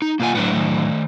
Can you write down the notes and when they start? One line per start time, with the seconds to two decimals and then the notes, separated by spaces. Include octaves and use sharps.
0.02 D#4
0.20 B1 A#3 F4 F#5 G#5
0.35 A2 F#3 B3 D4
0.51 D#3 A3